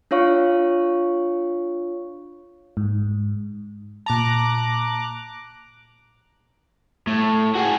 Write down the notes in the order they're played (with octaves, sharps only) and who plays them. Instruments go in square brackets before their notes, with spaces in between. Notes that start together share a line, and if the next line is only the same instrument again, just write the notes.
[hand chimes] D4 F4 C#5 F5 C#6
[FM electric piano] G#2
[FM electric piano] A#2 A5 [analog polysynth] A#5 D6 F#6
[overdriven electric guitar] A2
F#4 G#4